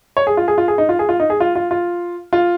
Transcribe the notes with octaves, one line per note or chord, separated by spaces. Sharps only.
C#5
G#4
F4
G#4
F4
G#4
D#4
F4
G#4
F4
D#4
G#4
F4
F4
F4
F4